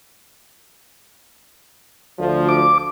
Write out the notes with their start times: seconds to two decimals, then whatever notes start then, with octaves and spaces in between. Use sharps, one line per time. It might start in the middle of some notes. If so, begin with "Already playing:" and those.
2.19 D2 F3
2.49 D6